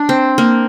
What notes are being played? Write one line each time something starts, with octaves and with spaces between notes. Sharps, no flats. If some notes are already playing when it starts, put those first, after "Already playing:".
Already playing: D4
C4
A#3